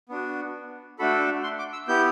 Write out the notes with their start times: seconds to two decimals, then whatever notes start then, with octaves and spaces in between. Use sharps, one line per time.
0.09 B3 D4 F#4
0.99 A3 D4 F#4 A4 B5
1.43 C6
1.59 D6
1.73 E6
1.88 B3 E4 G4 G6